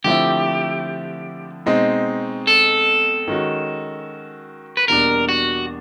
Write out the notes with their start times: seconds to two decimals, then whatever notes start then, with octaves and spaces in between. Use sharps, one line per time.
0.04 D3 F3 A3 C4 E4 G4
1.66 B2 G#3 C4 D#4
2.47 A4
3.28 D#3 G#3 C#4 F#4
4.77 B4
4.88 E2 B2 G3 A#3 D4 A#4
5.29 F#4